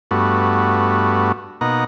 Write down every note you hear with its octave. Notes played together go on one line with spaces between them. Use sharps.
G2 A3 B3 F#4
B2 A#3 D#4 F#5 A#5